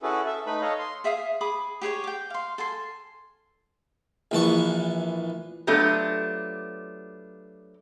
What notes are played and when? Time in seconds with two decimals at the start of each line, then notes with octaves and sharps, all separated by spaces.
0.03 C#4 E4 F#4 G#4 A4 B4
0.26 A4 E5
0.46 A3 D#4 B4 B5
0.61 A4 C#5 D#5 F5
0.79 C6
1.04 G#4 E5 F5 D#6
1.41 G#4 B5 D6 D#6
1.81 G4 G#4 B4 C#5
2.04 G5 D6
2.30 F5 C6
2.58 A4 G#5 C6
4.31 A#1 E3 A5 C#6
5.67 F#3 A3 B3 D4 F4 G4